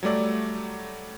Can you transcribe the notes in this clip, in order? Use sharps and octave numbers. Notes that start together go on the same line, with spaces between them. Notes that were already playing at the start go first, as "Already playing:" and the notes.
F#3 G3 A3 D5